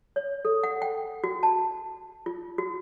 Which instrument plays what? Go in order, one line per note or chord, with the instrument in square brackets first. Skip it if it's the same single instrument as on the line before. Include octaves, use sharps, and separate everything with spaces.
[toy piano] C#5
A4
F#5
G5
F#4
A5
F4
F#4